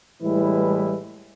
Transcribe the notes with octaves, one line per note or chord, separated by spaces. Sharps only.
A2 E3 G3 G#3 E4 B4